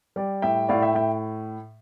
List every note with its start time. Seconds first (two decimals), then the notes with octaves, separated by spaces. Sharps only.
0.16 G3 D5
0.42 A2 E5 G5
0.68 A2 D5 F5
0.82 E5 G5
0.95 A2 E5 G5